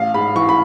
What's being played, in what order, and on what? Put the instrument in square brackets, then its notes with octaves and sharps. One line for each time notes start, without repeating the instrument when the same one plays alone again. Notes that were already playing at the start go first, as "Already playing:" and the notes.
Already playing: [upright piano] A1 F5
G#2 B5
E3 C#6
B5